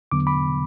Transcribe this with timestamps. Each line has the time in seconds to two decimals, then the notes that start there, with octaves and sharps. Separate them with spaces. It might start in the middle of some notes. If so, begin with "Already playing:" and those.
0.12 E2 D3 F#3 B3 D6
0.27 B5 D6